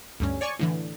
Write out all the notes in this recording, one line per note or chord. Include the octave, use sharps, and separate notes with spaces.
D2 G2 C#4
C#5 D5 G#5 C#6
A2 D3 E3